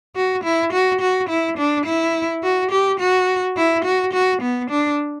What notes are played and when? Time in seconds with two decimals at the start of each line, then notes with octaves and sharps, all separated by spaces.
0.16 F#4
0.44 E4
0.73 F#4
1.01 F#4
1.29 E4
1.58 D4
1.86 E4
2.43 F#4
2.71 G4
3.00 F#4
3.57 E4
3.85 F#4
4.14 F#4
4.42 B3
4.70 D4